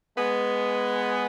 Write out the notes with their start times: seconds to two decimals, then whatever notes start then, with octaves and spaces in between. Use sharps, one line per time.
0.16 G#3 B3